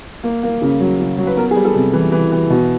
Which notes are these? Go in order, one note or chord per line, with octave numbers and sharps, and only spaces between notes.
A#3
A#3
C#3
F#3
C#3
F#3
B4
B3 A#4
G#4
G3
A4
C3
E3
E3
E3
B2